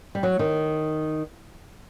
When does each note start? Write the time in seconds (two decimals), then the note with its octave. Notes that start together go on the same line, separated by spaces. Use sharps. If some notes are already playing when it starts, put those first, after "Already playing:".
0.15 G3
0.23 F#3
0.39 D#3